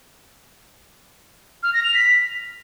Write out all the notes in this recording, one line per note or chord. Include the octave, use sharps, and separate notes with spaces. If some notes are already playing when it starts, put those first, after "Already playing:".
F6
A#6
F7
B6